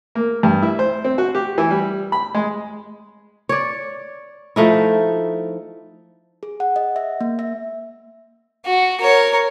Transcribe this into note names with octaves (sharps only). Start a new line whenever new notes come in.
A#3
G2
E4
C5
C4
F#4
G4
E3
G3
B5
G#3
C#5 D5
F3 A3 D#4 E4
G#4
F#5
D#5
E5
A#3
E5
F#4
A#4 C#5